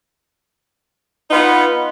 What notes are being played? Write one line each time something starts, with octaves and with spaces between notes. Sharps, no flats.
B3 D#4 F4 B4 F#5